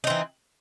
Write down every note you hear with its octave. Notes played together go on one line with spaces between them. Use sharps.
E3 C4 D#4